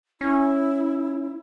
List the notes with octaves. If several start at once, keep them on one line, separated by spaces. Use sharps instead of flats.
C#4 E4